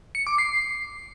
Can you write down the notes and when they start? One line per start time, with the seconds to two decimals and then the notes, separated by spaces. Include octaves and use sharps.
0.15 C#7
0.27 D6
0.38 C7